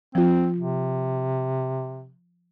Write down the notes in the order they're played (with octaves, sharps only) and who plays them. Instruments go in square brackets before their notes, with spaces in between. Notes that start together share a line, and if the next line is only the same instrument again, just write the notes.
[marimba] F3 F4 [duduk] C4
[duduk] C3